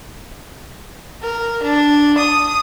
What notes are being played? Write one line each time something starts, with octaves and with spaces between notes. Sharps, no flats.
A#4
D4
D#6